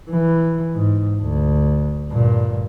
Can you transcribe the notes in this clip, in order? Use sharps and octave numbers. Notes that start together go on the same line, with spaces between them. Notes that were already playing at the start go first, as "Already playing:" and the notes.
E3
G#2
D2
G2 A#2